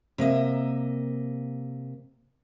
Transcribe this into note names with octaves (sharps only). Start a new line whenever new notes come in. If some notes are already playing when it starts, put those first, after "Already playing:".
C3 A#3 D#5 E5